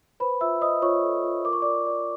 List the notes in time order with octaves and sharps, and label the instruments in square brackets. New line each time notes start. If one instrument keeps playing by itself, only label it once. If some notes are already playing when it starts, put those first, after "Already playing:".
[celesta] B4 C5 B5
F4 E5 E6
C5 D#5 D#6
F4 C#5 C#6
A4
F4
A#4 D6
C#6
A#4 D5 D6
D5